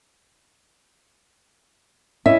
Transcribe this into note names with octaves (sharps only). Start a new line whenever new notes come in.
C#4 E4 D#5 E5